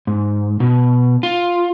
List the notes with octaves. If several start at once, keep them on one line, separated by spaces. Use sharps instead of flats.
G#2
B2
F4